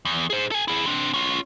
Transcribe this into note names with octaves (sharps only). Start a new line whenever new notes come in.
E2
G#4 C5
A4 G#5
E4 G#4
C4 D4
C#4 F4